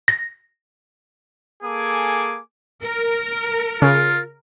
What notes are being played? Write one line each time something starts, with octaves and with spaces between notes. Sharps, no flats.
A#6
A#3 G#4 A4 G#5 D6
A#4
C#3 F4